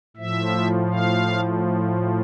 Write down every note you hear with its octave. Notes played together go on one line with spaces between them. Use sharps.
A2 F3 E5
F5